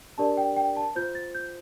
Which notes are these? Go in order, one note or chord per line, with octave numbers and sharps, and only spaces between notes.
D4 G4 A#4 D5 A5
G5
G5
A5
F4 C5 G6
A6
G6